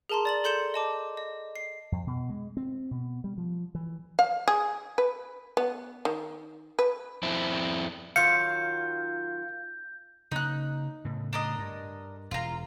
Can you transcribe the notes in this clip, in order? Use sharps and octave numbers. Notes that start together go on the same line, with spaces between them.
G#4 A#4 A5 A#5 C6
D5 A6 F#7
A4 C6 G6 C#7 E7
D#5 A5 D6
D#5
C7
F2
B2
G#3
C4
B2
G3
F3
E3
F5
G#4
B4
B3
D#3
B4
F2 C4 E4
D#3 F#3 F4 F5 G6 C#7
C#3 A#3 D#4 F#6
A2 C#3
D4 A#4 D#5
G2
E1 F4 A#5